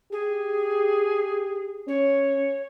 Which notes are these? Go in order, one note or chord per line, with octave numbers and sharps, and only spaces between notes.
G4 G#4
C#4 C#5